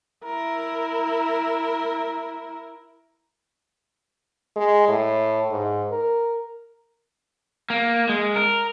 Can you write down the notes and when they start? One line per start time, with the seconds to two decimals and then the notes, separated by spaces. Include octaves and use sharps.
0.24 E4 A#4
4.56 G#3
4.88 A2
5.51 G#2
5.91 A#4
7.70 A#3
8.09 G#3
8.36 A#4